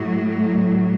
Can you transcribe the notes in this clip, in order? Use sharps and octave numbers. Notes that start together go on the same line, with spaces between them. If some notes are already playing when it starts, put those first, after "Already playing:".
Already playing: A2 F#3